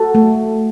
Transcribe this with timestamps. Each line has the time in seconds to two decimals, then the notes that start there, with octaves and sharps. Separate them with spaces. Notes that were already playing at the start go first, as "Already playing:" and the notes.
Already playing: F#4 A4
0.15 A3